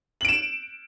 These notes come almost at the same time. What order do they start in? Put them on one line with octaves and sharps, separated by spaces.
F#7 D7 E7